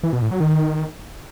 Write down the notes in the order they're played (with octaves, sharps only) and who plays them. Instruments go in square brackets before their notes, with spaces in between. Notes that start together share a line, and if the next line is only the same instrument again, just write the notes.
[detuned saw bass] E3
B2
A2
F#3
D#3